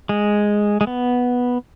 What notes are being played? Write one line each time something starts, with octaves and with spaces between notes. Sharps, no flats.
G#3
G#3
B3